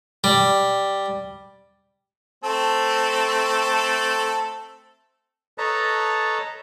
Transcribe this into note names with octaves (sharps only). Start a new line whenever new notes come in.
G3
A3 C4 A4
A4 B4 C#5 D#5 A5 A#5